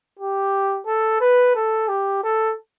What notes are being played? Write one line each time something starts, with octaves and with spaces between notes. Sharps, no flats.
G4
A4
B4
A4
G4
A4